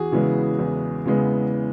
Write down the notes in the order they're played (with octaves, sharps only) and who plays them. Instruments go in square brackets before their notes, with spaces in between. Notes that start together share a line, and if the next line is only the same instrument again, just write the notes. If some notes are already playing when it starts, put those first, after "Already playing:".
Already playing: [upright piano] E2 F#4 G#4
C#3 E3 G#3 B3
E2
C#3 E3 G#3 B3